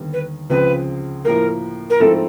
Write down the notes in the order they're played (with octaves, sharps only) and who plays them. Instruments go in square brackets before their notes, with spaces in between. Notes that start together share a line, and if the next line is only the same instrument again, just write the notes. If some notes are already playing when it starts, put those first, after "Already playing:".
Already playing: [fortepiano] D#2 D3 G3 B3
[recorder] B4
[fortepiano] C#2 C#3 F3 G#3 C4 [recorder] B4
[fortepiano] A2 F3 A#3 [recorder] A#4
[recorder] A#4
[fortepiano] G#2 F3 A3 C4 E4 [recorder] A4